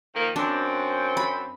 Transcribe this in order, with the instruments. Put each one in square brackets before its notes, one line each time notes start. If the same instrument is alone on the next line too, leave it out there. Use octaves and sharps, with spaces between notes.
[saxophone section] D#3 F3 A#3
[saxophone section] F#2 C4 [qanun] D4
[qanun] B5